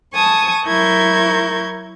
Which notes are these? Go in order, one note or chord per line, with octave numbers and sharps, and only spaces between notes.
G#5 A5 C#6 D#6
F#3 E4 A#4 C#6 G6 G#6